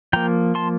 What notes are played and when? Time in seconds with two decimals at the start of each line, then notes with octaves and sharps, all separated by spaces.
0.13 F3 A#3 G5 A#5
0.55 A5 C6